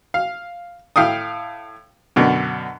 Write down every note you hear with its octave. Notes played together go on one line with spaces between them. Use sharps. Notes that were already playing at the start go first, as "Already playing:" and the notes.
F5
A2 F5 G5 D#6
F#2 B2 D3